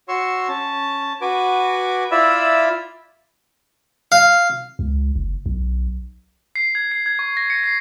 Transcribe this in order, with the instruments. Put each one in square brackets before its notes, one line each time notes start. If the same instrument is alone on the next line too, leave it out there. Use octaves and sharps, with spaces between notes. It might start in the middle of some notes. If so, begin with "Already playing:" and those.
[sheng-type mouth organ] F#4 C#5 C6 C#6 E6
C#4 A5
F#4 B4 G#5 D6
E4 F4 D5 E5 B5 E6
[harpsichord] F5
[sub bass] C#2
F#1
B1
[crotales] C7
G#6
C7
G#6
C#6
A#6
C#7
C7